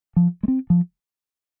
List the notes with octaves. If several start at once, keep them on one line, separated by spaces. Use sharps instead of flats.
F3
G#3
C4
F3